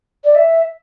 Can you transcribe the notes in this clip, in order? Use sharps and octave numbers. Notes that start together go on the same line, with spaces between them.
D5
E5